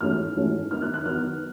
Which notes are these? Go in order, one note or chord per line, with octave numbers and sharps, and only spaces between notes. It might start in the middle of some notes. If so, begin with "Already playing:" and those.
G#2 E3 A3 C#4 F6
G#2 E3 A3 C#4
D#3 F#3 B3 D#4 F6
F#6
F#6
D#3 F#3 B3 D#4 F6